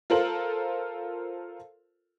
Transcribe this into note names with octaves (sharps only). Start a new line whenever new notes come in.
F4 A4 A#4 C5 F#7